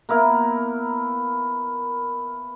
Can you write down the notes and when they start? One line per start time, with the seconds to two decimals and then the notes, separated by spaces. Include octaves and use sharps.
0.09 A#3 B3 E4 A#4